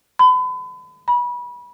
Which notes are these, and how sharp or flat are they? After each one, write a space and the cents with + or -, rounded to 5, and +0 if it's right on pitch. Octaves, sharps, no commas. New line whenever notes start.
B5 +40
B5 -25